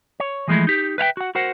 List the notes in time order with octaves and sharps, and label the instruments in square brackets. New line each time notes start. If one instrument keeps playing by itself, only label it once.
[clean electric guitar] C#5
E3 F3 G#3 A3 E4
D#4 G4
B4 E5 F5 G5
F#4 F#5
F#4 A#4 C5 F#5